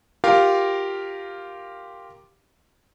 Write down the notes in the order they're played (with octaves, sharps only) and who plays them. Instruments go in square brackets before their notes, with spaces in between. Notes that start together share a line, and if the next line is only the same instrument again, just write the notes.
[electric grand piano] F4 G4 A#4 F5